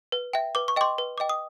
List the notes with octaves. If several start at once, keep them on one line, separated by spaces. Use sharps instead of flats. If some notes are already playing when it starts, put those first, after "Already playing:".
B4
E5 G5
B4 D6
C#6
D#5 G5 C6 D6
B4
D#5 G5 D6
D#6